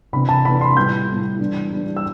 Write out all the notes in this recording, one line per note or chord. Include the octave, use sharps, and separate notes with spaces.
C3 E3 B3 D4 B5
A5
C3 E3 B3 D4 B5
C6
A2 G3 B3 G6
A2 G3 B3
E3 G3 B3 D4
E3 G3 B3 D4
E6